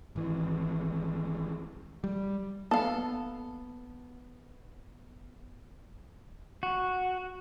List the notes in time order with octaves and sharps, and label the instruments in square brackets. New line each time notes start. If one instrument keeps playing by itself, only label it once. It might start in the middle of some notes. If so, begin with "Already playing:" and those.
[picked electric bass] G#1 E3
G3
[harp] B3 [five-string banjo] A4 F5
[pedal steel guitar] F#4